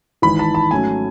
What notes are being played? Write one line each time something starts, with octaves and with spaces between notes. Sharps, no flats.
G#1 G#2 E3 B5
A5
A5
G#2 F#3 A3 C#4 G#5